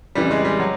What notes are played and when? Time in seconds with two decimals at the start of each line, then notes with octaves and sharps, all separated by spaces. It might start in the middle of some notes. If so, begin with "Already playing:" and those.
0.15 F2 C#3 E3 G3
0.31 G#3
0.45 G3
0.60 F#3